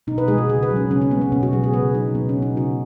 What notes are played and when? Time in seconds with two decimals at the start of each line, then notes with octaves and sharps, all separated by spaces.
0.07 B2 D#4
0.18 B4
0.28 G#3 G#4
0.38 F#4
0.49 C#3 G#4
0.63 B4
0.70 F#3
0.76 C#4
0.90 C#3 C#4
1.02 C#4
1.11 G#3 B3
1.21 B3
1.32 B2 C#4
1.43 F#4
1.53 F#3 G#4
1.64 G#4
1.73 C#3 B4
1.95 F#3 D#4
2.15 B2 B3
2.29 C#4
2.37 F#3
2.42 D#4
2.56 C#3 F#4